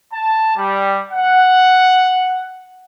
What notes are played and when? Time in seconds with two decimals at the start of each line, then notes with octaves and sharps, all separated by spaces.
0.12 A5
0.56 G3
1.10 F#5